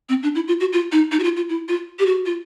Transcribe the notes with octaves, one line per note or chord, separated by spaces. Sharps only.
C4
D4
E4
F4
F#4
F4
D#4
D#4
F#4
F4
F4
E4
F4
G4
F#4
F4